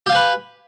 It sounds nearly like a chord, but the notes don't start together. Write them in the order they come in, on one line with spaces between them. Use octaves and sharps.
G4 F5 G#5 B4